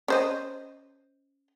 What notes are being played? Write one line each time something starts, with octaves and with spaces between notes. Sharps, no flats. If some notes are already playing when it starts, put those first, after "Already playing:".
C#4 C5 D#5